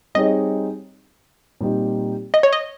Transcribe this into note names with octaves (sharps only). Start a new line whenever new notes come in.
G3 C4 D#4 G#4 C#5 D#5
A#2 G3 C4 D#4 G4
D#5
C#5
D#5